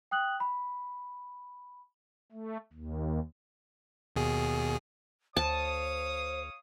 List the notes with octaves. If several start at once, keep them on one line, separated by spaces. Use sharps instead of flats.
G5 D#6 F#6 F#7
B5
A3
D#2
D#2 B2 G#4
D2 C5 C#5 F5 A5 D#6